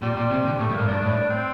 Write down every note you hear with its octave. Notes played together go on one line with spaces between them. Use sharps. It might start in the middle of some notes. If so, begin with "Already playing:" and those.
A#2 G3
A#2
C3
D3
A2 A3
G2
A2 A#3
G2 D4
A2
D4
C4